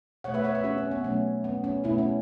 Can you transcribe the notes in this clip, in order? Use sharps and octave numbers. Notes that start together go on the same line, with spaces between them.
B2 A3 C#5 F#5
B4 E5
C#5 F#5
B4 E5
C#4 F#4
C#4
B3
B2 F#3 A3 C#4
B3
C#4
B2 A3 B3 E4
C#4